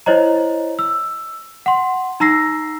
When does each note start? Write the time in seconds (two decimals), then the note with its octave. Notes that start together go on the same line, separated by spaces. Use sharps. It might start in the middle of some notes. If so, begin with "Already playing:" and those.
0.06 E4 C5 C#5 D#5 A#5
0.79 E6
1.66 F#5 C6
2.20 D#4 A#5 E6 A#6 C7